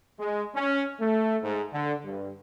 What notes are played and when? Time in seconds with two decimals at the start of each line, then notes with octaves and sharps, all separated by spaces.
0.19 G#3
0.55 C#4
1.00 A3
1.42 G#2
1.72 D3
2.04 G2